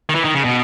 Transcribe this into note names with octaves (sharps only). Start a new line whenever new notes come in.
D#3
E3
D#3
C#3
B2